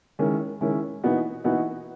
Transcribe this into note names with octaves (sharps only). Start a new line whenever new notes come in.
D#3 G#3 C#4 E4
D#3 G#3 C#4 E4
E3 B3 D#4 F#4
E3 B3 D#4 F#4